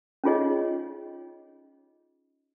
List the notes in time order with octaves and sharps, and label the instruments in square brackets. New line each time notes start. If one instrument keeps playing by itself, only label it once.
[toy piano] C#4 D#4 F4 G#4 C#5 D#5